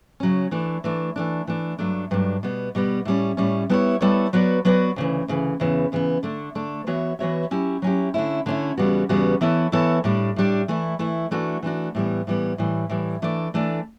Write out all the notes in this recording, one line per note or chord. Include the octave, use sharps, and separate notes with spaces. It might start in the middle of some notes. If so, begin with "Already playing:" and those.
C#3 F#3 C#4
E3 A3 D4
E3 A3 D4
E3 A3 D4
E3 A3 D4
G2 F#3 A3 D4
G2 F#3 A3 D4
B2 G3 B3
B2 G3 B3
A2 G3 C#4
A2 G3 C#4
G3 B3 E4 A4 C#5
G3 B3 E4 A4 C#5
F#3 B3 F#4 B4 D5
F#3 B3 F#4 B4 D5
D2 C#3 E3
D2 C#3 E3
E2 C#3 E3 B3
E2 C#3 E3 B3
D3 A3 D4
D3 A3 D4
E3 B3 F#4 C#5 E5
E3 B3 F#4 C#5 E5
F#3 C#4 E4 G4
F#3 C#4 E4 G4
D3 A3 C#4 E4
D3 A3 C#4 E4
E2 C#3 G3 B3 F#4
E2 C#3 G3 B3 F#4
E3 B3 E4 A4 C#5
E3 B3 E4 A4 C#5
A2 G3 D4
A2 G3 D4
E3 A3 E4
E3 A3 E4
E3 A3 D4 F#4
E3 A3 D4 F#4
A2 E3 G3 B3
A2 E3 G3 B3
A2 E3 G3
A2 E3 G3
E3 A3 D4 A4 D5
E3 A3 D4 A4 D5